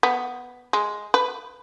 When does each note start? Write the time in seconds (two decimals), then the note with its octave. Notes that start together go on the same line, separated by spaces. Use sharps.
0.03 B3
0.73 G#3
1.14 B4